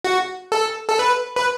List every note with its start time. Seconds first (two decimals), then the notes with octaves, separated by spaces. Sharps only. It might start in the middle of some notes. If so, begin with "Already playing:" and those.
0.04 F#4
0.52 A4
0.89 A4
0.99 B4
1.36 B4